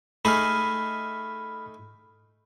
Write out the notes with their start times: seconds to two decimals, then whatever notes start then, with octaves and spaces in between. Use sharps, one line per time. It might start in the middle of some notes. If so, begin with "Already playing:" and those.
0.25 A3 D#4 G#4 B5 F6